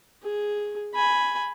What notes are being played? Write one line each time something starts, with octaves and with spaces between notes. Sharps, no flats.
G#4
G#5 B5